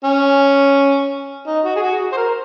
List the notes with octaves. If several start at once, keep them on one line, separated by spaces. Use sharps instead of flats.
C#4
D#4
F#4
G#4
F#4
C5
A#4